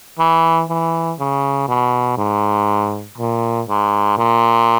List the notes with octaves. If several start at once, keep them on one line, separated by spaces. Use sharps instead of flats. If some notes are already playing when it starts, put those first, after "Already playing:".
E3
E3
C#3
B2
G#2
A#2
G#2
A#2